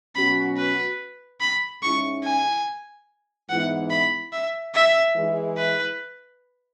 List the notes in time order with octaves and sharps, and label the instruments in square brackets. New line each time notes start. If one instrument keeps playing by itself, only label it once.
[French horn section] B2 F#3 C#4 F#4 [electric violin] B5
[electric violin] B4
B5
[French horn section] G#2 G#3 C#4 E4 [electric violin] C#6
[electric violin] G#5
[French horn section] G#2 E3 B3 E4 [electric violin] F#5
[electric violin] B5
E5
E5
[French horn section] E3 G#3 E4 G#4
[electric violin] B4